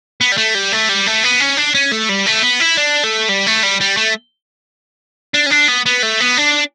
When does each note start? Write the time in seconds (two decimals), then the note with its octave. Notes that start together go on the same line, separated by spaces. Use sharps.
0.21 B3
0.32 G3
0.37 A3
0.55 G3
0.72 A3
0.89 G3
1.06 A3
1.23 B3
1.40 C#4
1.57 D4
1.75 C#4
1.92 A3
2.09 G3
2.26 A3
2.43 B3
2.60 E4
2.77 D4
3.04 A3
3.29 G3
3.46 A3
3.63 G3
3.81 G3
3.97 A3
5.34 D4
5.46 C#4
5.51 D4
5.68 B3
5.86 B3
6.03 A3
6.20 B3
6.37 D4